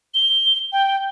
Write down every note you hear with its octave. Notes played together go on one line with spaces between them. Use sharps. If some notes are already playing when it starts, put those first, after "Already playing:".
G7
G5